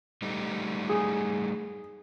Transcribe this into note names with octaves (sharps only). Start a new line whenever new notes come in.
G3 A3 D#4
G#4